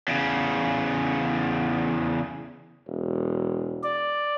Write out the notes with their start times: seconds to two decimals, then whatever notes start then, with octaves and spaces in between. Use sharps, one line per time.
0.08 E2 C#3
2.87 E1
3.84 D5